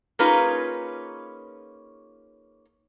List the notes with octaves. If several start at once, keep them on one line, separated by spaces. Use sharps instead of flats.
A#3 C#4 D#4 F4 G#4 B4